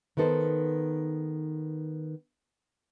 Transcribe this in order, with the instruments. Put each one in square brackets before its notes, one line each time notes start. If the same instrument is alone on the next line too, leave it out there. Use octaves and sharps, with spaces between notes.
[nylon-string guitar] D#3 B3 D#4 A4 C5